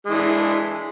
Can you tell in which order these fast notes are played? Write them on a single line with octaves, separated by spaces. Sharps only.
G#3 E3 D4